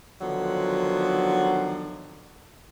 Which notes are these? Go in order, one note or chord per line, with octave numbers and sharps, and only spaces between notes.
D3 D#3 F3 F#3 B3 D#4